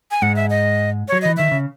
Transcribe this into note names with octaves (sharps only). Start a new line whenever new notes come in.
G#5
G#2 G#3 F#5
E5
D#5
F#3 C#5
E3 D#5
D#3 E5
C#3